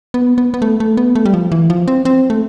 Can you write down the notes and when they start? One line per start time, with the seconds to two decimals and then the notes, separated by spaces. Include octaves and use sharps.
0.14 B3
0.38 B3
0.54 B3
0.62 A3
0.80 A3
0.97 B3
1.15 A3
1.25 G3
1.34 F3
1.52 E3
1.70 F3
1.88 C4
2.05 C4
2.30 A3